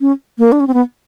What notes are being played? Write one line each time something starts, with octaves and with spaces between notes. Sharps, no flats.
C#4
A#3
D4
C#4
C4
B3